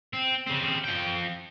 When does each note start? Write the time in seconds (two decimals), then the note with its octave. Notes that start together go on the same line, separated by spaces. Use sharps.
0.13 C4
0.47 C#3 C4
0.84 F3 G5